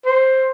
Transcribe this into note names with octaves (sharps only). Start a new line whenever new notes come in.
C5